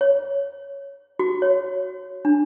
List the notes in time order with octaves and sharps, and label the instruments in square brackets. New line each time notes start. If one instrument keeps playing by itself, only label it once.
[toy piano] C#5
F#4
C#5
D4